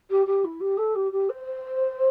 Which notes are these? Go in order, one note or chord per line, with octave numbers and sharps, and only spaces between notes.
G4
G4
E4
G4
A4
G4
G4
C5